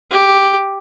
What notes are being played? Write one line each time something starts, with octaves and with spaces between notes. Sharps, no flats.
G4